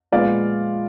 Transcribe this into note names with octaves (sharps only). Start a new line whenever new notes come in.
A#2 F3 G#3 B3 F4 D5 F5